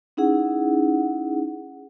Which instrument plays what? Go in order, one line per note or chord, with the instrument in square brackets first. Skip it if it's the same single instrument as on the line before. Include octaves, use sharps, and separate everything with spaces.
[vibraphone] C#4 D#4 E4 G#4 F#5